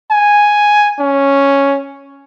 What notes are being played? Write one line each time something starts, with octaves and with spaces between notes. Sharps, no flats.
G#5
C#4